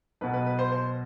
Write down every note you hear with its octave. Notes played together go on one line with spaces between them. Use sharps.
B1 B2 B3 B4
B4
B4
C5
C5